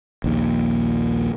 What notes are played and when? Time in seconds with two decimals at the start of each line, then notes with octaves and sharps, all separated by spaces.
0.24 A#1 D#2